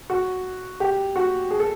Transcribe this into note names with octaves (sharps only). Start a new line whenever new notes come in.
F#4
G4
F#4
G#4
A4